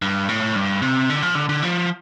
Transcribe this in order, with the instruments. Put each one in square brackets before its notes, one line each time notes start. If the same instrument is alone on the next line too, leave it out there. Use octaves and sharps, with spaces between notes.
[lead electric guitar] G2
A2
G2
C3
D3
F3
D3
D3
F3